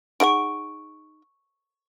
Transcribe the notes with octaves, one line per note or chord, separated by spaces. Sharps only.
D#4 G#4 F#5 C#6 D7